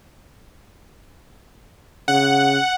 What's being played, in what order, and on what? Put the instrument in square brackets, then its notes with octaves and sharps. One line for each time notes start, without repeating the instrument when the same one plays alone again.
[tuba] C#3 [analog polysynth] F#5